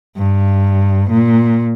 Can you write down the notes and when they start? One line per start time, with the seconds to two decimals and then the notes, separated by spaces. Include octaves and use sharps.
0.17 G2
1.10 A#2